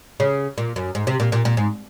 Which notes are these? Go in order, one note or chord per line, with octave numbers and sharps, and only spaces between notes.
C#3
A#2
F#2
G#2
C3
A#2
A#2
A#2
G#2